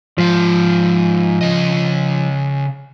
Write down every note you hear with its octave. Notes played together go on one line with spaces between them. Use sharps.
G#2 F3 F5
C#3 D#5